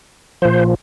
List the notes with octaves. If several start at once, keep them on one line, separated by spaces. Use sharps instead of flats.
A#2 F3 C5